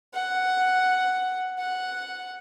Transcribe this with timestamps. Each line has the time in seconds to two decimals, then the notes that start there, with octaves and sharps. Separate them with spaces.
0.14 F#5
1.58 F#5